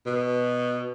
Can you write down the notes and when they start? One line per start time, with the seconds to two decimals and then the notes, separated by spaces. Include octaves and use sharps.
0.06 B2